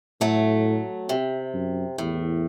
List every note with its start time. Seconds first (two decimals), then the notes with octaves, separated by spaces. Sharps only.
0.21 A2 F#3 A3
1.09 C3
1.54 F#2
1.98 E2 A2